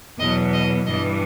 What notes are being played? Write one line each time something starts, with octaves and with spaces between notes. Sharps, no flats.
E2 B2 F#3 D#5
D#5
G2 E3 D#5